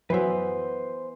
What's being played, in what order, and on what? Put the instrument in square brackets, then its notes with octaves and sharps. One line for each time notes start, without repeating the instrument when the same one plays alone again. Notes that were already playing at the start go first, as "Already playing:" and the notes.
[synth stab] F#2 F#3 E5 [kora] E3 B3 [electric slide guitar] B4 C5